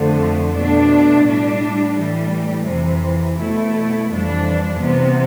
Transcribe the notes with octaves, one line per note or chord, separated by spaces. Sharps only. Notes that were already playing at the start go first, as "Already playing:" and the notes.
Already playing: F2 D3 F3 A3
B2 A3 D4
A2 G3 D4
A2 E3 G3
F2 C3 E3
B2 A3 E4
F2 E3 G3 D4
C3 E3 B3